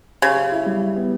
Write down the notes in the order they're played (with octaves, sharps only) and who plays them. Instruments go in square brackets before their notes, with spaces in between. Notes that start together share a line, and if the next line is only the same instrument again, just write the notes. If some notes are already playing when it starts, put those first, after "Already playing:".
[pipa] C#3 [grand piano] G4
[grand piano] G4
E4
G3
E4
B3